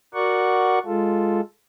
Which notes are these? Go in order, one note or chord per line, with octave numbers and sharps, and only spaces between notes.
F#4 A#4 D5 F#5 C#6
G#3 F4 A4